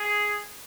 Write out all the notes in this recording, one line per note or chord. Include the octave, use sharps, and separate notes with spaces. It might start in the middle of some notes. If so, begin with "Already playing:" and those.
Already playing: G#4